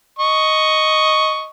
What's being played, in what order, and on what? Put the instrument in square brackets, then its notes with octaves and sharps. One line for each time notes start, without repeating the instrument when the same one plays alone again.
[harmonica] D#5 C#6